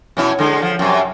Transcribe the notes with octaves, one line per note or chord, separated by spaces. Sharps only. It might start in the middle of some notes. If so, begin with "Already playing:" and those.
B2 C#4 E4
D3 G#3
F3
F#2 C3